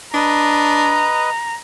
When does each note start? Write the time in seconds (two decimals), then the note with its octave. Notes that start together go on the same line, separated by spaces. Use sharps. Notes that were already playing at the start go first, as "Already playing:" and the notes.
0.14 D4 B4 D#5 A#5